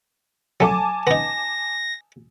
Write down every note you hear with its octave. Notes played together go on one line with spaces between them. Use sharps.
F#3 A3 G#5 A5 D6
B3 D#4 A#6